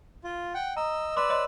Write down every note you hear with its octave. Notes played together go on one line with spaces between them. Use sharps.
F4
F#5 G5
D#5 A#5 E6
B4 D5 C6 D6 E6
C#5 D#5 C6